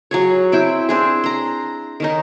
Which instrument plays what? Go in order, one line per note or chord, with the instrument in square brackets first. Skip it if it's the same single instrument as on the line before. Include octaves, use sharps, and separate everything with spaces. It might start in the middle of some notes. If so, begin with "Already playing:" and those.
[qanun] F#3 G#4 C#5
C4 E4 G5
C4 D4 G#4
A#5 C6
D#3 C#4 D#4